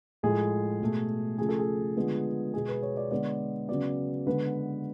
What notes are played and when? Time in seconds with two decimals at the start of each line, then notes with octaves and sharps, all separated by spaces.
0.23 A2 F3 G#3 G#4
0.81 B2 A3
1.38 C#3 F3 A3 G#4
1.49 A4
1.59 G#4
1.96 D3 F3 G#3 B3
2.54 B2 G#3 B3 G#4
2.68 B4
2.83 C#5
2.97 D5
3.11 D3 G#3 B3 D5
3.69 C#3 F#3 B3 D5
4.27 D3 G#3 B3 B4